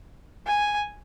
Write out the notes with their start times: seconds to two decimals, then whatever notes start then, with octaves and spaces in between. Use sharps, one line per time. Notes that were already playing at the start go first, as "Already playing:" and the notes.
0.47 G#5